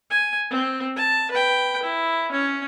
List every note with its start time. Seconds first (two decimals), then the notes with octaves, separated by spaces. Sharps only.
0.10 G#5
0.51 C4
0.96 A5
1.31 B4 G5
1.83 E4
2.32 C#4